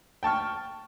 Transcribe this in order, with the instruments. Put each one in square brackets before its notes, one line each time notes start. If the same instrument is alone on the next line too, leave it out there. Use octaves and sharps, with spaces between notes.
[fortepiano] G5 A5 C#6 F6